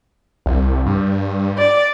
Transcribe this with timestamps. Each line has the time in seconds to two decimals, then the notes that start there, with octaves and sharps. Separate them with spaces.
0.46 C2
0.86 G2
1.57 D5